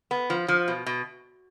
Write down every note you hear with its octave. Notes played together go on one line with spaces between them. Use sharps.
B3
F3
F3
B2
B2